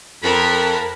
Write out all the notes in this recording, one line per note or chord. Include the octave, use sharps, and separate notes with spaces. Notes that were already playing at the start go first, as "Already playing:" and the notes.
F2 A#4 A5 B5